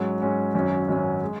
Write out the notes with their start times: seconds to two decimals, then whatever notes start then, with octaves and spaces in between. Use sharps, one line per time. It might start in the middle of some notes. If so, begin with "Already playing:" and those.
Already playing: G#2 F#3 C#4 F#4
0.21 G#2 F#3 C#4 F#4
0.54 G#1 F#2 F#3 C#4
0.88 G#1 F#2 F#3 C#4
1.24 G#3